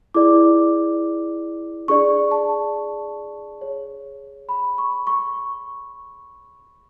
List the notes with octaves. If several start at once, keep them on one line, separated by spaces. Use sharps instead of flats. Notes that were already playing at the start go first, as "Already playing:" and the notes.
E4 G#4 D5 D6
D4 G#4 D5 C#6
A5
G#4 C#5
B5
C#6
C#6